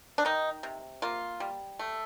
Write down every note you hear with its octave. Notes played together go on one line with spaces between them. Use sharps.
D4
D#3 D#4
C3
A#3 F4
G3
A3